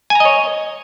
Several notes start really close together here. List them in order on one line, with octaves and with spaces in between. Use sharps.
G#5 A#5 D#5 C#5